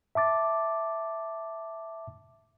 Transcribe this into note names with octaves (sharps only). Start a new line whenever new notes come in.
E5 A5 D6 A6